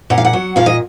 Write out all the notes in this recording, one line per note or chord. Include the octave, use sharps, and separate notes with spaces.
A#2 F#5
F5
F#5
F#3
A#2 F5
D#5